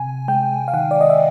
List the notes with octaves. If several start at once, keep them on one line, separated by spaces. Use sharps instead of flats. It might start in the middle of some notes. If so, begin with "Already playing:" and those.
Already playing: C3 G#5
G#3 G5
F5
D#3 F#5
D5
D#5
E5